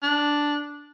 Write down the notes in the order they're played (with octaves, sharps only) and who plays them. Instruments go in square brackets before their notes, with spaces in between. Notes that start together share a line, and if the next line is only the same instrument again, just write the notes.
[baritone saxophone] D4